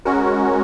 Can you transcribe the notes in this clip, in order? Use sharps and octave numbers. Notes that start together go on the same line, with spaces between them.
G#3 C#4 F#4 A#4